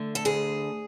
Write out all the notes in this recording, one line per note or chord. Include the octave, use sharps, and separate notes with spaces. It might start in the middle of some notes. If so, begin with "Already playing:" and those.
Already playing: D3 A3
A4
D2 G#4